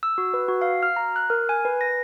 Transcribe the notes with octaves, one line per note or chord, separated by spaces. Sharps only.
E6
F#4
B4
F#4
F5
F6
A#5
F#6
A#4
G#5
B4
A#6